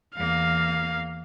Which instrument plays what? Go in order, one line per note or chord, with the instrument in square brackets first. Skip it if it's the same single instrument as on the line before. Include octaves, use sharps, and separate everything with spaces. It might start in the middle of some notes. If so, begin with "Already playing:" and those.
[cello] E2 A#3 [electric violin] F5